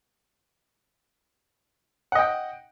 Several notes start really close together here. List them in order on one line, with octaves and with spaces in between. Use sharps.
F#5 D#5 G5